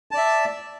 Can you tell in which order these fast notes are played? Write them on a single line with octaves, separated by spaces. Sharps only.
A5 D5 E5